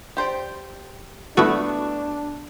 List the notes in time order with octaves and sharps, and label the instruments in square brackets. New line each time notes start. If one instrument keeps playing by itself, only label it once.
[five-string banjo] G4 C5 D5
[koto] A3 B3 [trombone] D4 [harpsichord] E4 F#4